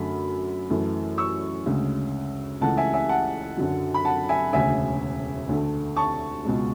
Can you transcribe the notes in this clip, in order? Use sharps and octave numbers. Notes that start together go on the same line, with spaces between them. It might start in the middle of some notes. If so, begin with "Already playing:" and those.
Already playing: F#2 D3 F#3 A3 B5
F#2 E3 A3
C#6 E6
D2 C#3 G#3
C#2 C#3 E3 A3 F#5 A5
E5 G#5
E5 G#5
F#5 A5
F#2 D3 F#3
B5
F#5 A5
E5 G#5
E1 D2 C#3 E5 G#5
D2 D3 A3
A5 C#6
C#2 B2 G#3